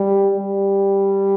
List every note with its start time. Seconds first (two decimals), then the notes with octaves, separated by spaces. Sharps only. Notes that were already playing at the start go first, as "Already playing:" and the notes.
Already playing: G3
0.38 G3